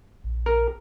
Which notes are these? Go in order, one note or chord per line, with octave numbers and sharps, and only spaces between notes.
A#1
A#4